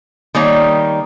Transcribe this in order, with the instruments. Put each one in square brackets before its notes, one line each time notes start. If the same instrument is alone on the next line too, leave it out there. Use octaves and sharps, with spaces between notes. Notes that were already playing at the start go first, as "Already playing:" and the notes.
[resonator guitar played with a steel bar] D#3 G3 A#3 C#5